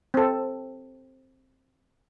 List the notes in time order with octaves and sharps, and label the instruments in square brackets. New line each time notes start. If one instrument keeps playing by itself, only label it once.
[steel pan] C4 A4